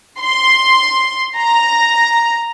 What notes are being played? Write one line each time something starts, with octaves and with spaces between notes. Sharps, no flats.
C6
A#5